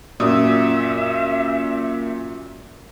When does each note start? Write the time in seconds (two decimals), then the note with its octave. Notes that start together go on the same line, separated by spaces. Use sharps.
0.20 F#2 A#2 E5 D#6 E6